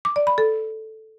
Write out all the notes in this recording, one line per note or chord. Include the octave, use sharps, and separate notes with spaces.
D6
D5
B5
A4